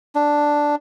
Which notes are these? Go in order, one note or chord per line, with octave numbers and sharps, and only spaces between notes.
D4